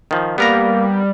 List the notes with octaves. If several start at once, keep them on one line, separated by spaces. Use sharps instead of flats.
D#3 F3
G3 A#3 B3 A#4 A#5